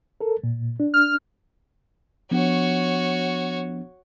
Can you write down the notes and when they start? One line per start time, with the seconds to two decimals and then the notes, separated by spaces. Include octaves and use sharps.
0.21 A4 A#4
0.43 A#2
0.80 D4
0.94 F6
2.31 F3 B3 D4 F#4 C#5